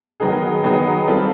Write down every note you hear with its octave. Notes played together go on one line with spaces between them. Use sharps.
D#3 F#3 B3 D#4 G#4
D#3 F#3 B3 D#4 G#4
G3 C4 F4 A4